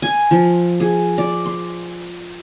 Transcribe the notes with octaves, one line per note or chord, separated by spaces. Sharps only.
G#5
F3
G#4
D5
C6